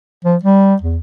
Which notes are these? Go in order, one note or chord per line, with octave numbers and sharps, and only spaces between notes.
F3
G3
E2